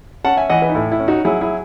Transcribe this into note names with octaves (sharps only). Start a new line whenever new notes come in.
C#4 F#5 A5
E5 G#5
E3 D#5 F#5
B4 D#5
D#4
A2 E4
E4
C#4
D#4 F#4
F#3 E4 G#4
E4 G#4